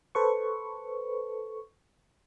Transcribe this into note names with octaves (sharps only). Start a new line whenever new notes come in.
A4 B4 C5 C#6